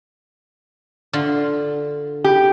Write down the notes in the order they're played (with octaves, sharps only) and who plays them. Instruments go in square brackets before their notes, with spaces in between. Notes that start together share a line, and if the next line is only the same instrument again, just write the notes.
[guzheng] D3 F4
[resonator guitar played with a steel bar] G4